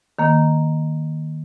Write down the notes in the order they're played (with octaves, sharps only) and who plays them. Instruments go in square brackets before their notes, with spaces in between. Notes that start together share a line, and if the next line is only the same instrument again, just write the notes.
[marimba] D#3 A#3